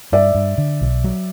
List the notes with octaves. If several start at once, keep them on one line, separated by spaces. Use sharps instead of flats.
G2 D5 E5
G2
D3
B1
F#3